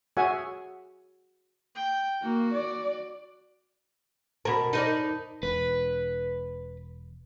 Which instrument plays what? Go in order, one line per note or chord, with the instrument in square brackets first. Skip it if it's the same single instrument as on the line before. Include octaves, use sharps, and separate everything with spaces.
[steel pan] F#4 G#4 C#5 E5 F#5 G#5
[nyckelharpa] G5
[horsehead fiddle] A#3 [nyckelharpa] F#4
[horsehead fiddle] D5
[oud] B2 A#4 [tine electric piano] A5 B5
[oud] D#4 A#4 D5
[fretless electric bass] E1 [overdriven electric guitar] B4